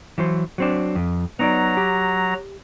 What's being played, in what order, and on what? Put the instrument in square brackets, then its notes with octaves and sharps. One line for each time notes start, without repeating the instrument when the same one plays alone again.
[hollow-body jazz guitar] E3 F#3 C5
F#3 C4 D4
F2
[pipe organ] F#3 A#5 [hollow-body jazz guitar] B3 D#4 D5
[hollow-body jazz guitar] G4